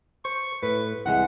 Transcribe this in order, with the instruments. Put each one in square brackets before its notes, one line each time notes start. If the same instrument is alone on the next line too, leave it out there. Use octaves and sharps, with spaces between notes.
[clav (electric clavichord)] C5 [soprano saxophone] C#6
[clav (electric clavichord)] A2 [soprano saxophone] B4
[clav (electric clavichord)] C2 E3 G#3 [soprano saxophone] F#5